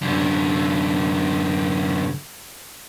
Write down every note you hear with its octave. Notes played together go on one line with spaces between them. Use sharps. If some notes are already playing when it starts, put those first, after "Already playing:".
F#2 D3